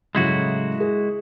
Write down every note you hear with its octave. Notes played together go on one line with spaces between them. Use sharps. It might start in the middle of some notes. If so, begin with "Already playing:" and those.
A2 C#3 F#3 G#3 E4 F#4
G#4